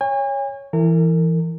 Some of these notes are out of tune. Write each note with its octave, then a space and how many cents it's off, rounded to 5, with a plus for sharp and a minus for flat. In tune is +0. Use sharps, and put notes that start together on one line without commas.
C#5 +0 G#5 -40
E3 +5 A#4 -35